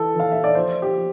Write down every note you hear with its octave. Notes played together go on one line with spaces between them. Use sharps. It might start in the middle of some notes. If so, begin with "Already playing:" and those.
Already playing: E3 A4
E3 F5
E5
D5
F3 C5
G4
F3